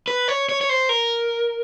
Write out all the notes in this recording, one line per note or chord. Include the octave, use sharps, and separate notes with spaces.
B4
C#5
C#5
C#5
C5
A#4